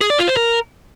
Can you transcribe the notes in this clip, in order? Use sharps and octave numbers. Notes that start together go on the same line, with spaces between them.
G#4
D5
F4
C5
A#4